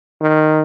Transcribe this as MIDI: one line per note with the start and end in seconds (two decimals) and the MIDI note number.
0.21 0.62 51